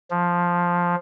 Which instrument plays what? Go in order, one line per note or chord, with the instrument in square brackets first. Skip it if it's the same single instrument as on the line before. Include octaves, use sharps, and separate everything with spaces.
[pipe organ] F3